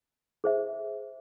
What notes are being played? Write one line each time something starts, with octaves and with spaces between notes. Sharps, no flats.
G#4 C5 E5